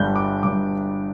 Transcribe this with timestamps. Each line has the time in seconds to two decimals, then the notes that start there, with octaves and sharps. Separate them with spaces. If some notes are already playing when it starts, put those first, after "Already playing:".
Already playing: G1 G2 G3 D4 G6
0.16 D6
0.43 G1 G2 G3 D4 D6